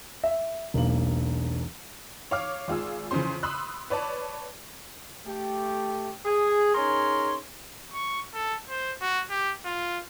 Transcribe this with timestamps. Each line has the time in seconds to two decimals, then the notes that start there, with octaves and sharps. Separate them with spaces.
0.24 E5
0.74 E1 B1 A#3 F#7
2.31 C#5 F5 D6 F6
2.68 G#1 F4 G#4 E6
3.11 F2 C#3 E3 C#4 C5 C6
3.43 B5 C6 D#6 E6 F#6
3.90 B4 C#5 D5 A5
5.26 A3 G4
6.25 G#4
6.74 C#4 D#4 G#4 A#4 C#5 C6
7.93 C#6
8.34 A4
8.69 C5
9.01 F#4
9.30 G4
9.65 F4